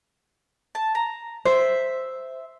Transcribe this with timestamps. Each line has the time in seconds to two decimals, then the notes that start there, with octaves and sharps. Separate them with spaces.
0.75 A5
0.95 A#5
1.45 C5 E5